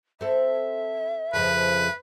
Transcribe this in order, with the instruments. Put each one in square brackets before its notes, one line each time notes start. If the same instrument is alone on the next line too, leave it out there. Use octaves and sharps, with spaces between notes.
[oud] C4 A4 [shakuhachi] E5
[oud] F2 C#3 F3 [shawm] B4